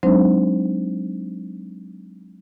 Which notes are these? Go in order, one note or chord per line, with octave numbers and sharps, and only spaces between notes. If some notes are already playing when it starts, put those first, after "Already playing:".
F#3 G#3 C4 D4 D#4 C5